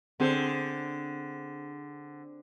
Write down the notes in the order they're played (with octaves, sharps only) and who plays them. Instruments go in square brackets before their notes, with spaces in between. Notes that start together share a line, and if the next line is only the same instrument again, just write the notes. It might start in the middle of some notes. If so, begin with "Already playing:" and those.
[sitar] D3 [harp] C4 G#4 C5